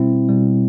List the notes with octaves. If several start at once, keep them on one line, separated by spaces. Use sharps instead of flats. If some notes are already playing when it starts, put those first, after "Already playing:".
Already playing: B2 G3 C4 E4
B2 G3